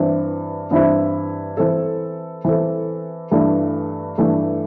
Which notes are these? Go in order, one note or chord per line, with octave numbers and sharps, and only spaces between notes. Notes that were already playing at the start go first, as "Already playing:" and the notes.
Already playing: G2 E3 C4 E4
G2 E3 C4 E4
E3 C4 A4
E3 C4 A4
G2 E3 A3
G2 E3 A3